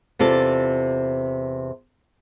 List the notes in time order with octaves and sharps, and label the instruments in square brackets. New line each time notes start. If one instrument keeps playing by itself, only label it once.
[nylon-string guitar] E2 C3 F4 A4 D5